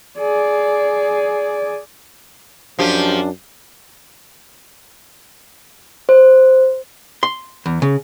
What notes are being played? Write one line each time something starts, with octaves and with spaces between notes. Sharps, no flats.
G#4 D5
F#2 F3 D4 G4
C5
C6
E2
C#3